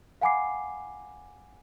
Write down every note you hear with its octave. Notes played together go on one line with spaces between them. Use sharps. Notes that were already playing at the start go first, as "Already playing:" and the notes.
F5 F#5 G#5 B5 D6 C7